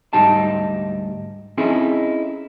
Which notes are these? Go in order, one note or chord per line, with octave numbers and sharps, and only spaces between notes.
D2 G#2 G3 D#4 G4 A5
C4 C#4 D#4 E4 G#4 A4